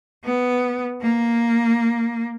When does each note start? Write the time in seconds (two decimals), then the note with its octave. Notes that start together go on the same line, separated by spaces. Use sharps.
0.24 B3
1.02 A#3